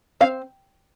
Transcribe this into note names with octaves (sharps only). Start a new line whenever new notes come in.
C4 F5